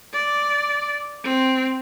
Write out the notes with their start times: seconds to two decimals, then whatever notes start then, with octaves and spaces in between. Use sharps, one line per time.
0.13 D5
1.24 C4